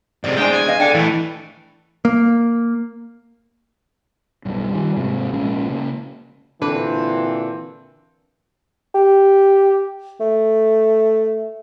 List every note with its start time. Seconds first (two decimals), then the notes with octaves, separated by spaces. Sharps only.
0.24 G#2 C3 D5
0.37 A2 G#3 D4 G#4 C5 G5
0.54 G#5
0.68 B4 D#5 F5
0.80 D4 A4 G5
0.94 A2 E3 A3
2.05 A#3
4.45 B1 G2
4.69 D#3 G3
4.97 G#2 C3
5.33 A#1 G#3 C#4
5.68 C#3 A#3
6.62 A#2 D3 E3 C4 D4 F#4 B4
8.94 G4
10.20 A3